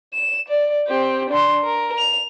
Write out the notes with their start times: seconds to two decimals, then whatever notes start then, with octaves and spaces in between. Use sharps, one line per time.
0.14 E7
0.48 D5
0.87 C4 G4
1.30 D4 C6
1.64 A#4
1.98 F7